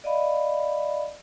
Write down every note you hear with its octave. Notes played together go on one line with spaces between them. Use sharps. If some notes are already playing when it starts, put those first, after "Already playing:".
D5 D#5 F5 B5